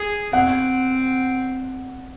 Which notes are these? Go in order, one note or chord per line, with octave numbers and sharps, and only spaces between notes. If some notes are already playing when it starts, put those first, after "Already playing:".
Already playing: G#4
C4 F#5